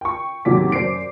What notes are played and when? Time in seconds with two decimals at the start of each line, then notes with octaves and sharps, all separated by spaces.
0.01 G5 C#6
0.45 D#2 A2 C3 F#3 D6 B6
0.72 F#2 C5 D5 C7 D7